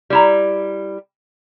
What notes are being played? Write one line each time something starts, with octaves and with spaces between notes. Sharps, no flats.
G3 E4 A#5